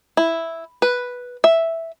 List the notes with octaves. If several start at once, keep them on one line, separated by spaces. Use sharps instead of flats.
E4
B4
E5